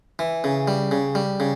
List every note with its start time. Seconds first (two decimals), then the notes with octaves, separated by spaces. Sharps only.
0.19 E3
0.44 C#3
0.68 G3
0.91 C#3
1.15 G3
1.40 C#3